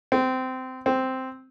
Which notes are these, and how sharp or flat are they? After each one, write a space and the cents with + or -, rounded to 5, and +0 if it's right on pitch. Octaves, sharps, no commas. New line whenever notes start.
C4 -20
C4 -5